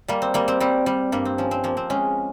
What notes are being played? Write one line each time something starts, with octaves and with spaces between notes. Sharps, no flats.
G3 A#3
C4
G3 A#3
C4
G3 C4
G3
G2 A#3
C4
F3 C#4
C4
F3 A#3
C4
G#3 C#4